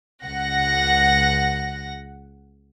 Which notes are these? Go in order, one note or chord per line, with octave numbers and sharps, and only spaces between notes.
C#2 F#5 A#6